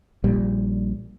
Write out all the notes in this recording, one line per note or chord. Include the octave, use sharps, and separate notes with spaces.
A#1 A#2 G3